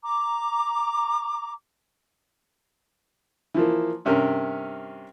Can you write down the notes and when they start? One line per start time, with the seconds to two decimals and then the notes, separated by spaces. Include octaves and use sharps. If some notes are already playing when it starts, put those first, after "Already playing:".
0.03 A#5 D6
3.54 E3 F3 A#3
4.05 G2 C3 C#4 A#4